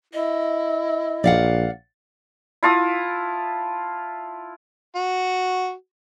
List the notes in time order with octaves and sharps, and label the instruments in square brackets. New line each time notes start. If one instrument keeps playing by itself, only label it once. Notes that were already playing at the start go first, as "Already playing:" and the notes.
[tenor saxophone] E4 [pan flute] D#5
[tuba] A#1 [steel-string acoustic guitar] D5 F5 F#5
[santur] E4 F4 A5 D#6
[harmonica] F#4